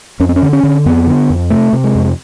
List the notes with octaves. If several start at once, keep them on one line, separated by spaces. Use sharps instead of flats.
F2 C#4
C4
C#4
D3
C#4
D3
F2 B3
D3
F2
C3 A3
C3
G#3
F2